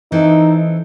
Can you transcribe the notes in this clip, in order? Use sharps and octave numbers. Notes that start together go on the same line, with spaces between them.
E3 C4 D#4 A4